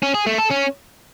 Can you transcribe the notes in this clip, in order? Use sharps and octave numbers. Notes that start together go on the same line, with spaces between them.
C#4
G#4
A3
A4
C#4